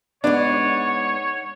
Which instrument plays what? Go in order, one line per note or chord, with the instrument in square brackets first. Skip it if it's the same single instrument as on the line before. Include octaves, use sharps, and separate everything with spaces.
[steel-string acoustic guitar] G#2 B3 [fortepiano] D4 [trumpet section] C#5